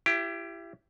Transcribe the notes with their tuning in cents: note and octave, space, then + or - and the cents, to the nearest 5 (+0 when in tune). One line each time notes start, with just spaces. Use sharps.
E4 +30 G4 +0